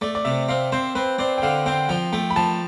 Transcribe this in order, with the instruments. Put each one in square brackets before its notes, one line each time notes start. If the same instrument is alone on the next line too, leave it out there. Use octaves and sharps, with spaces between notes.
[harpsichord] A3 [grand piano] D5
[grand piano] D5
[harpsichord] C3 [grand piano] E5
[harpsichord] C4 [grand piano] F5
[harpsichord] C4 [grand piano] C5
[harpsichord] C4 [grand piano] B4
[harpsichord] C4 [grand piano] D5
[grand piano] G5
[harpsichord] D3 [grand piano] F5
[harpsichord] C4 [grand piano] G5
[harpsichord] F3 [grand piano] G5
[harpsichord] A3 [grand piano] G5
[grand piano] B5
[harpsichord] F3 [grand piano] A5